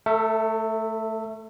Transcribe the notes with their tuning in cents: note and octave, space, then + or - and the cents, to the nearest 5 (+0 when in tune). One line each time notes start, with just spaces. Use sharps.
A3 +0 A4 +40 E5 -5